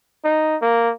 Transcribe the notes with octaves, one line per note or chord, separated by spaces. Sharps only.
D#4
A#3